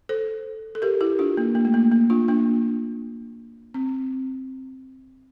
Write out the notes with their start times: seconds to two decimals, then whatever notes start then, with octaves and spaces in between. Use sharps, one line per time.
0.09 A4 C5
0.75 A4
0.82 G4 A#4
1.01 E4 G4
1.19 D4 F4
1.37 A#3
1.55 A#3
1.65 A3
1.74 A#3
1.92 A#3
2.10 D4 F4
2.28 A#3 D4
3.74 C4